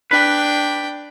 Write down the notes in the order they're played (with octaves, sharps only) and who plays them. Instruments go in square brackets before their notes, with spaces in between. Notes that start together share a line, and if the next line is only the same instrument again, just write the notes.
[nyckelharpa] D4 G5 [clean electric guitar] B4